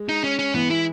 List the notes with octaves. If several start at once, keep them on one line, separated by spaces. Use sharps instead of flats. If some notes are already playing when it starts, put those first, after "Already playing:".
Already playing: G#3
D#4
C#4
C#4
E3 B3
E4